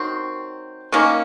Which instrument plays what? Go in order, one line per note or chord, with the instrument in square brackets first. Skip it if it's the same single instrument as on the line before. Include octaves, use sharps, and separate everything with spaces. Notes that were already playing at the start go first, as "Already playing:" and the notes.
Already playing: [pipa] D#3 F#3 C4
D#3 A#3 C#4